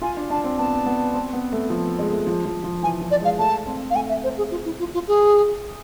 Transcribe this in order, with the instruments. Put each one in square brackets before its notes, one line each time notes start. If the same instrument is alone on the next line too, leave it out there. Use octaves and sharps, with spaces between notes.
[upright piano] F4 [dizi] G#5
[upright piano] D4
[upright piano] D4 [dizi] A5
[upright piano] C4
[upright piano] B3 [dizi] A5
[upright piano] B3
C4
B3
A3
F3
G#3
A3
F3
F3
F3
[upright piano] E3 [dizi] G#5
[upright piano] F3
[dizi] D5
[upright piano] G#3 [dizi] F5
[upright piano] A3 [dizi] A5
[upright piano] C4
[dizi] F5
[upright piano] A3 [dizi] G#5
[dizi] E5
C5
G#4
F4
E4
F4
F4
G#4